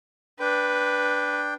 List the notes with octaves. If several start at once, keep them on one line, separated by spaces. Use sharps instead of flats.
D4 B4 G5